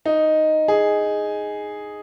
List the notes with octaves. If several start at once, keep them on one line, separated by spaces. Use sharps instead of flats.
D#4
G#4